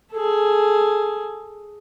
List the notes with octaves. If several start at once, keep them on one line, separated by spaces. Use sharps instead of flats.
G#4 A4